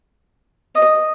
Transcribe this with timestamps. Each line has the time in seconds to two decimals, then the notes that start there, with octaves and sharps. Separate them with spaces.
0.75 D#5